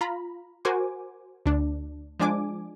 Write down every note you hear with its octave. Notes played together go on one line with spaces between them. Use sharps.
F4 A#5 B5
F#4 A#4 C5 G#5 D6
D2 D4
F3 G#3 D4 G#5 D6